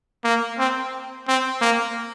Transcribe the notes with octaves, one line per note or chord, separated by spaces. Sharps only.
A#3
C4
C4
A#3